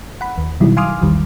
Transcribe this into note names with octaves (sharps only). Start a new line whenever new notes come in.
F#5 B5
D#2
B2 D#3 F#3 G3 D#4 E4
F5 G#5 C6 D6 D#6 F6
A#1 E2 D#3 G3